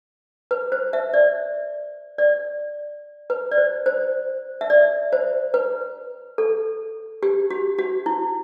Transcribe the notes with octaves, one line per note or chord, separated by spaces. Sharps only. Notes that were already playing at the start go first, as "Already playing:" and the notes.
B4
C5
E5
D5
D5
B4
D5
C5
C5
E5
D5
C5
B4
A4
G4
F#4
F#4
E4